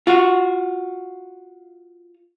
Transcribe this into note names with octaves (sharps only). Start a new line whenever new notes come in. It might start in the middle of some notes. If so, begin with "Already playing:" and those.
F4 F#4